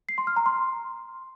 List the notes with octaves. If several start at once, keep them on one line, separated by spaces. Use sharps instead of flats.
C7
C6
F6
A#5
C6